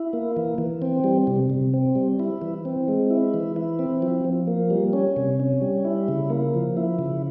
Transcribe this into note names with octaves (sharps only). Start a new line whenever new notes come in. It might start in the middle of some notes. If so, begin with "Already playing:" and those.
Already playing: E4
A#3
E3
E3
C4
G3
C3
C3
C4
G3
E4
E3
C4
G#3
E4
E3
E4
C4
F3
F3
A#3
G3
C#4
C3
C#4
G3
E4
C#3
A#3
F3
E4
C#3